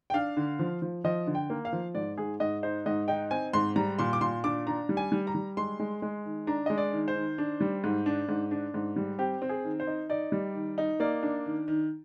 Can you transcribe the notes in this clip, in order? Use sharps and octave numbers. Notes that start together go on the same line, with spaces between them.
G5
D4 F5
D3
F3
F3
F3 D#5
D3
G5
A#3
F5
F3
G#2 D5
G#2 G#4
G#2 D#5
D#4 C5
G#2 D#5
D#4 G5
C4 G#5
G#2 C6
G3 A#5
A#2 C6
D6
A#2 C6
D4 D6
D4 A#5
G3
G#5
G3
A#5
G3
G#3 C6
G#3
G#3
D#3
D4 A#5
G#3 D#5
D5
D#3
C5
D#3
D4
G3
G#2
D4
G#2
D4
G#2
G3
C4 G4
C4
G#4
D#3
C5
D#4
D#4 D5
G3
D#3
D#4
A#3 D5
D4
D#3
D#3